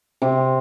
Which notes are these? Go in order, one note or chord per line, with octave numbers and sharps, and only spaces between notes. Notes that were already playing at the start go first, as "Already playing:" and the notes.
C3